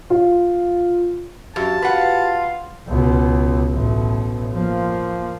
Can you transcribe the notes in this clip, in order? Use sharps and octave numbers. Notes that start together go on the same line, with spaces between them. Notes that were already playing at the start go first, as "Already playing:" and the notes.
F4
F#2 F#4 G4 F5 A5
F4 B4 F#5
C#2 B2
A1 B2
F3 A#3